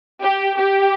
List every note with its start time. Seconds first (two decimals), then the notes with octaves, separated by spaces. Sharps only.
0.23 G4
0.57 G4